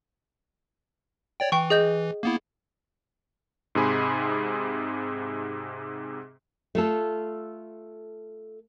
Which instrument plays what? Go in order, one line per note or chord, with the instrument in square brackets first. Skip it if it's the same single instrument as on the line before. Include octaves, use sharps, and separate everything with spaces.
[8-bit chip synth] C#5 D5 G5
[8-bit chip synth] E3 [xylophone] G5 C#6
[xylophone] G#4 D#5 G6
[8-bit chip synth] A#3 B3 E4
[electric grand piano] G#2 C3 G#4 B5 C6
[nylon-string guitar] A3 F4 A4